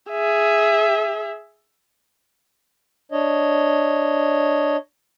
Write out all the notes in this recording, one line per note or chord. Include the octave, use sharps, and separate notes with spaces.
G#4 E5
D4 C#5 D#5